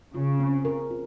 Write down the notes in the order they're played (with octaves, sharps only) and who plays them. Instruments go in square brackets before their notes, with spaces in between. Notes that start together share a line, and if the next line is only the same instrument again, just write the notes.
[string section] C#3 [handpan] F4
[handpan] C4
A#4
F4